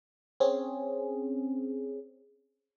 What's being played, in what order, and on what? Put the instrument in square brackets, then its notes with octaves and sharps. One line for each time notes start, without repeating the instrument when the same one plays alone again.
[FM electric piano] C4 C#4 G#4